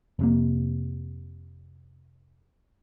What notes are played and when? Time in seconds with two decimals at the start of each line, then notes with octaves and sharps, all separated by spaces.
0.19 F1 C3 A#3